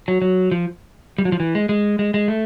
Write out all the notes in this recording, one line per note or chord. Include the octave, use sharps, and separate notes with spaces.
F#3
F#3
F3
G3
F#3
F3
E3
G#3
G#3
G#3
G#3
A3